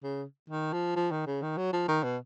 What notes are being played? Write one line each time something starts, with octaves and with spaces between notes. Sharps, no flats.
C#3
D#3
F3
F3
D#3
C#3
D#3
F#3
F3
D#3
B2